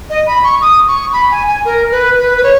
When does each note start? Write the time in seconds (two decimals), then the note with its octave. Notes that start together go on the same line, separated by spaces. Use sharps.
0.10 D#5
0.27 B5
0.44 C#6
0.62 D#6
0.88 C#6
1.13 B5
1.31 G#5
1.48 G#5
1.65 A#4
1.92 B4
2.18 B4
2.37 B4
2.43 C#5